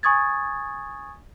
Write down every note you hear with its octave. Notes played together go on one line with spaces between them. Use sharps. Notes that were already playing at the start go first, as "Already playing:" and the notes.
G#5 C#6 D#6 G#6 A6